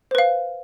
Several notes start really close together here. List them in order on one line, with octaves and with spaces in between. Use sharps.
C5 B4 F5